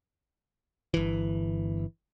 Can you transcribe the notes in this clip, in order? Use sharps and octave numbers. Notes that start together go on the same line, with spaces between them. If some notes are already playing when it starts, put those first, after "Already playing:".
G1 E3